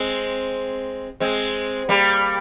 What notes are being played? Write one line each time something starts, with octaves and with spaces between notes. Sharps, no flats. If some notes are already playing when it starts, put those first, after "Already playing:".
Already playing: G#3 C4
G#3 C4
G3 A#3